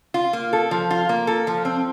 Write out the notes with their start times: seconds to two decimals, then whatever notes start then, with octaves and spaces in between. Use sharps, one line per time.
0.14 F4
0.33 A#3
0.53 A4
0.71 F3
0.91 F4
1.09 A#3
1.27 A4
1.47 F3
1.65 C4